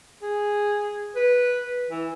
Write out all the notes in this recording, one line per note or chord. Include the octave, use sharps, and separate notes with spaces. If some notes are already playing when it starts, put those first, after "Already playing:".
G#4
B4
E3